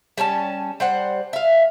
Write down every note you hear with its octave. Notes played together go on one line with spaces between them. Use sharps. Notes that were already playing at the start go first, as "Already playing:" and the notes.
G3 C#4 G#5 A5
G3 C5 F#5
E5 F5